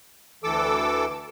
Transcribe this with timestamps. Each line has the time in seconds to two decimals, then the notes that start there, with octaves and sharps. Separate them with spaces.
0.44 D2 E3 A4 D6 E6